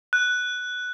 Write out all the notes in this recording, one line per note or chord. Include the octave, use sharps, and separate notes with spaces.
F#6